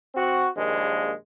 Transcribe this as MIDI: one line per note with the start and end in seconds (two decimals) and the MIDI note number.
0.15 0.48 60
0.15 0.48 66
0.56 1.12 34
0.56 1.12 39
0.56 1.12 56